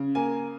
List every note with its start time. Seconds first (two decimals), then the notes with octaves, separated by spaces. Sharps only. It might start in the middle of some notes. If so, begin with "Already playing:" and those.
Already playing: C#3
0.15 A#3 G#5